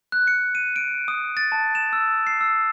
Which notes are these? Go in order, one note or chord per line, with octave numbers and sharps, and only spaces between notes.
F#6
C#7
D#7
D7
D#6
A6
A5
E7
E6
C7
E6